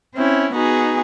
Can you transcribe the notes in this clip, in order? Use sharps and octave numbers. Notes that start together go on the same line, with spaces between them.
C4 C#4 E4
B3 D#4 F#4 G#4